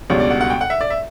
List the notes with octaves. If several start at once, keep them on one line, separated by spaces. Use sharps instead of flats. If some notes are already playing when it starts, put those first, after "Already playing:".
C#2 B2 G3 D4 C#5
D5
F#5
F#5
G5
F#5
E5
D5
E5